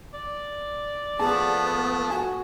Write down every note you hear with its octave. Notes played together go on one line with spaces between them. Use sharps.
D5
F3 A3 B3 G#4 A5
F#4 G#5